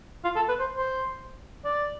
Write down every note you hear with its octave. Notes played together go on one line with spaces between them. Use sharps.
F4
A4
B4
C5
C5
D5